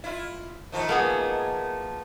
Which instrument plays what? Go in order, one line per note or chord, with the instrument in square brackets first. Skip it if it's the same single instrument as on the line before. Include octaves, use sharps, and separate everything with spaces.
[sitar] E4 F4
D#3 F3 A3
[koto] A#3 B3 G#4